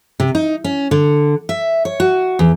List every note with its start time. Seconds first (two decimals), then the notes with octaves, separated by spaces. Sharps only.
0.20 C3
0.35 D#4
0.64 C#4
0.91 D3
1.49 E5
1.85 C#5
2.00 F#4
2.39 E2